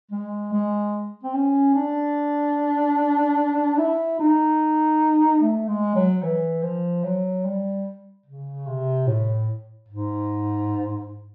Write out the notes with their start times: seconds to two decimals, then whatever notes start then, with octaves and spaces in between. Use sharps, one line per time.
0.11 G#3
0.53 G#3
1.24 C4
1.34 C#4
1.75 D4
3.78 E4
4.19 D#4
5.41 A3
5.68 G#3
5.95 F#3
6.23 E3
6.63 F3
7.04 F#3
7.45 G3
8.26 C#3
8.67 C3
9.07 A2
9.89 G#2